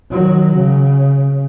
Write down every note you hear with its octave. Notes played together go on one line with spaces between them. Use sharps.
D#3 F#3
C#3